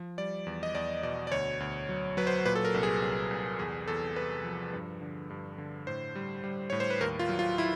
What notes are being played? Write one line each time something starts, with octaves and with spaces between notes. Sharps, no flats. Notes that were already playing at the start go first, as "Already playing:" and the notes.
Already playing: F3
G3 D5
E2
D#5
E2 D5
B2 D5
D5
D2 C#5
D2
F#3
F#3 B4
C5
A#2 B4
A4
A#4
C2
G#4
C2
C2
E2 G#4
E2 A4
C3 B4
F3
G2
D3
G2
D3
A2 C5
G3
G3
A2 C#5
C5
B4
D#2 A#4
F4
F#3
F4
E4